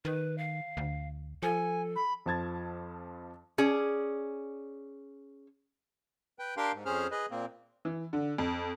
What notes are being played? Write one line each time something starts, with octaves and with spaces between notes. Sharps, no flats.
D#3 B4
F5
D2
F3 A4 G#5
B5
F2 F3 A5 G#6 A6
C#4 G#4 D5
B4 G5
D4 G4 A#4 F5 G5 C6
G#2
F2 C#4 G#4 C5 F6
G#4 B4 D#5
A#2 A#3 C4
E3
D3
F2